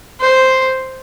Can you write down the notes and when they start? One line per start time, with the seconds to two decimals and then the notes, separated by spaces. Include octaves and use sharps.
0.20 C5